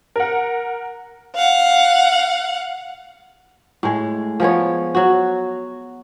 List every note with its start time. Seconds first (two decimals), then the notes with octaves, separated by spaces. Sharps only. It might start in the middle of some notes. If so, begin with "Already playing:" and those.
0.16 A#4 F#5
1.35 F5 F#5
3.83 A2 G#3
4.40 F3 G#3 B3 C#5
4.95 F#3 F#4